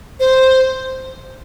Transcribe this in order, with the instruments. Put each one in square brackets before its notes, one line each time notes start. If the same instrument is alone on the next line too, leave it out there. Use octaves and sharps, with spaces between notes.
[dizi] C5